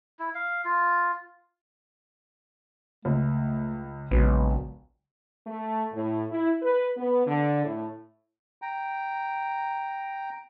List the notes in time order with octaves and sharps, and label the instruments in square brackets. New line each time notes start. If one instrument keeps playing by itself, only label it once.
[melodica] E4
F5
F4
[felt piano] C#2 [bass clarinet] A3
[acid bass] A#1 [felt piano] C#3 F#3 B3 [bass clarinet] G#3
[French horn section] A3
A2
E4
B4
B3
D3
A2
[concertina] G5 A#5